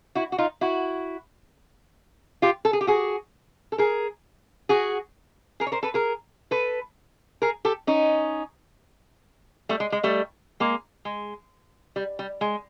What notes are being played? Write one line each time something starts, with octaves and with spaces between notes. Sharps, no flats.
E4 F#4
F#4
D#4 F4
E4 F#4
F4 G4
A4
G#4
G4
F#4 G#4
A4
G#4 A#4
F#4 G#4
G#4 A#4
C#5
A#4 C5
A4 B4
G#4 A#4
A4 B4
G#4 A#4
G4 A4
C#4 D#4
G3 A3
G#3
G#3
G3 A3
G#3 A#3
G#3
G3
G3
G#3